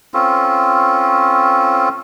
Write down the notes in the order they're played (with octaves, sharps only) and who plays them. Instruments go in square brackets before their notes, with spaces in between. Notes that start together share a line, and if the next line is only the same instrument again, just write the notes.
[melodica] C4 C#4 F4 A4